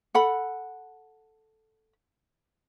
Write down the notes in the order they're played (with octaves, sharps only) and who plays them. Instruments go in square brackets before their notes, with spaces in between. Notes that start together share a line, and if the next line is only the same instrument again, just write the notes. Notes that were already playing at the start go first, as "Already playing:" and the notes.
[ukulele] A4 F#5 B5